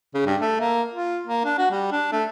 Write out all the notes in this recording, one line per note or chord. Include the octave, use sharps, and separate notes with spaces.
C#3
G2
A3
A#3
F4
A#3
D4
F#4
G3
D4
A3